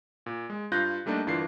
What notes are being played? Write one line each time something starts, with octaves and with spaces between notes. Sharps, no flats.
A#2
G#3
G2 F4 F5 F#6 G6 A#6
G3 A3 A#3 D4 D#4
G1 E3 D4 F4 A#4 C7